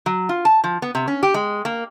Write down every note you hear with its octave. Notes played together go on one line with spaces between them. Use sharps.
F#3
F4
A5
F3
B3
C3
C#4
G4
G#3
A#3